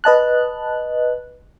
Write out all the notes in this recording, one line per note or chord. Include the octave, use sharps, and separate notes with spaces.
B4 D#5 A5 F#6